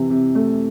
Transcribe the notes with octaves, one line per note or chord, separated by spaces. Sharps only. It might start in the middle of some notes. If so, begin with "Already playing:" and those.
Already playing: C3 E3
C3
A3